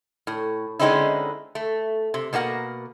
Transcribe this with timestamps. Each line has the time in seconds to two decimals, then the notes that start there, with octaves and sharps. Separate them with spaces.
0.27 A2
0.79 D3 G#3 C4 C#4 D#4 E4
1.55 A3
2.14 C3
2.33 B2 A#3 A#4 F#5